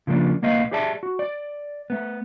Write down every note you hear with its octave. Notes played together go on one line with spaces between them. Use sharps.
C#3 F3 A#3 B3 D4
B1 A#3 B3 D#5 F5
G4 G#4 D5 E5 A5
F#4
D5
A3 B3